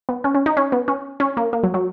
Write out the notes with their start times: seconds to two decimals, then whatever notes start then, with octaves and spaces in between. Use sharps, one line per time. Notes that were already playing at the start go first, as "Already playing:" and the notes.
0.09 B3
0.24 C#4
0.35 C#4
0.46 D#4
0.57 C#4
0.72 B3
0.88 C#4
1.20 C#4
1.37 A#3
1.53 A#3
1.63 F#3
1.74 F#3